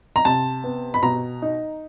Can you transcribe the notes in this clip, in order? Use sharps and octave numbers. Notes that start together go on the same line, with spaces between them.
A#5
C3 A5
B3
B5
B2 A#5
D#4